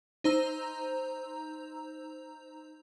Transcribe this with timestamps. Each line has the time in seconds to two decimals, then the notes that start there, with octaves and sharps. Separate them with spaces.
0.24 D#4 C5 A#5 E6